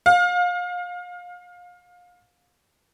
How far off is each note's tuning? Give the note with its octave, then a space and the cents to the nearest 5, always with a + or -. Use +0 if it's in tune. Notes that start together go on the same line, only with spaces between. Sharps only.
F5 +30